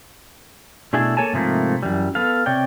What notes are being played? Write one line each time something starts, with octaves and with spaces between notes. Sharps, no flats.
B2 A3 D4 E4 G#4 A4
A#3 A4 C#5 G#5 A5
G#2 C3 F3 A3 A#3
F#2 E3 G3
B3 A4 F5
C3 C#5 D5 G5